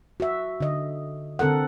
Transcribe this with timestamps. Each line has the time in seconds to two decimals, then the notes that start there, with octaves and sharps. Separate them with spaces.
0.20 F#4 E5
0.60 D3 D#5
1.39 D3 C4 A4 A#4 F#5